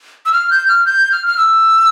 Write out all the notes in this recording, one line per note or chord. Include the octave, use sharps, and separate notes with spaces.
E6
F6
G6
F6
G6
F6
F6
E6